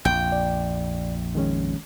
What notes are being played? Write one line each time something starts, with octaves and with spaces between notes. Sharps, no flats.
A#1 F2 G5
D5
D#3 G#3 C#4